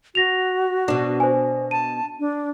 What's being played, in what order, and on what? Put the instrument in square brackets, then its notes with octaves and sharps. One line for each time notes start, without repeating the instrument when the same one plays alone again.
[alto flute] F#4 [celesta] A#6 F7
[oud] B2 D4
[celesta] C5 G#5
[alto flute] A5 [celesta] D#7
[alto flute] D4